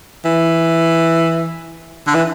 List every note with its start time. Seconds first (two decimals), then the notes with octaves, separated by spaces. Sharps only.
0.25 E3
2.07 D3
2.15 E3